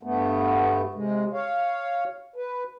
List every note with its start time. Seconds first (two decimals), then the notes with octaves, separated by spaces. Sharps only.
0.03 G2 A3 B3
0.94 C3 G#3
1.33 C#5 F5
2.36 B4